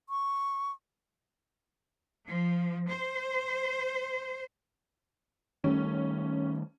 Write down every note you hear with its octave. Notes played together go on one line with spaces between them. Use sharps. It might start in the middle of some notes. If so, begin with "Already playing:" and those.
C#6
F3
C5
D#3 G3 A3 C#4